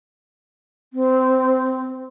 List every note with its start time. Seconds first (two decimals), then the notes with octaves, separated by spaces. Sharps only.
0.93 C4